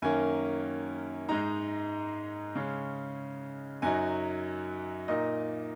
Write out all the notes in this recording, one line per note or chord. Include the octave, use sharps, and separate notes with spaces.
F#2 D#3 A#3 C#4 G#5
G#2 G#3 D#4 A#5
C#3 G#3 C#4
F#2 F#3 D#4 G#5
A#2 A#3 D#4 D#5